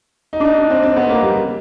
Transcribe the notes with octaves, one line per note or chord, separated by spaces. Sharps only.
D#4
D4
D#4
D4
C4
C4
B3
A#3
G3
C#3